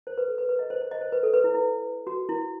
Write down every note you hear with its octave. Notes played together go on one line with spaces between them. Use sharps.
C5
B4
A4
B4
B4
D#5
C5
C5
D#5
C5
B4
A4
B4
E4
E4
F#4
E4